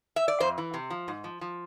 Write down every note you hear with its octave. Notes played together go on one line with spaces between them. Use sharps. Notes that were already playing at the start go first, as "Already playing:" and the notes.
E5
D5
F2 C5
E3
C3
F3
G#2
F3
F3